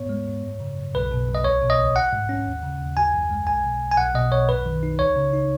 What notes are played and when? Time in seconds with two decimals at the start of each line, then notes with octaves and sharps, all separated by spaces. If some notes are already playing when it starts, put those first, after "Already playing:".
Already playing: G#2 B3 C#5
0.09 G#3
0.27 G#2
0.43 F#2
0.60 C#3
0.77 F#2
0.95 B1 B4
1.11 B2
1.28 B1
1.35 D#5
1.44 C#2 C#5
1.62 B2
1.70 D#5
1.79 C#2
1.95 G#1 F#5
2.12 G#2
2.29 C#4
2.46 D#2
2.63 C#3
2.80 D#2
2.97 G#1 G#5
3.14 F#2
3.31 G#3
3.47 B1 G#5
3.64 B2
3.81 B1
3.91 G#5
3.97 B1 F#5
4.15 B2 D#5
4.32 B1 C#5
4.49 F#2 B4
4.66 D#3
4.83 D#4
4.99 C#2 C#5
5.16 C#3
5.33 D#4